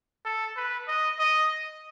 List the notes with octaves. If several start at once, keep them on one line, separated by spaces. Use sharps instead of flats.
A4
B4
D#5
D#5